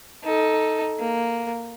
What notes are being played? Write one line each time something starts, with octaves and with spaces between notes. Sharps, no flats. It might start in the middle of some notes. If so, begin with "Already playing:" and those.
D#4 A4
A#3